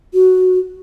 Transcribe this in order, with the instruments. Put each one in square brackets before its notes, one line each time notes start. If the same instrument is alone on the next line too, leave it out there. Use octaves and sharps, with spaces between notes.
[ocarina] F#4